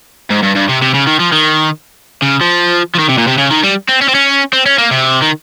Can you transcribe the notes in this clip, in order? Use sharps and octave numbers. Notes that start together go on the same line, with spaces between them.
G#2
G2
G2
C3
C3
C#3
D#3
F3
D#3
C#3
F3
F3
D#3
C3
A#2
C3
C#3
D#3
G3
C4
C#4
C4
C#4
C4
C#4
A#3
C3
D#3